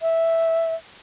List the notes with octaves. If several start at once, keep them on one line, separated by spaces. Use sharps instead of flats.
E5